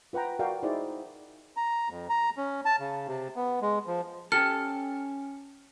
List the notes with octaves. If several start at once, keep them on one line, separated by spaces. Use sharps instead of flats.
F4 B4 F#5 G5 A#5
F#4 A#4 D5 F5 G5
D#4 E4 F#4 G#4 C5 D5
A#5
F2
A#5
C#4
A5
C#3
C3
B3
G#3
F3
C#4 G4 A4 F6 C#7